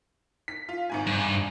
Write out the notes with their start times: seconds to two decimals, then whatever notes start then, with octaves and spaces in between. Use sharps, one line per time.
0.48 B6
0.69 F4
0.90 G#1 G#2 G#5
1.07 G2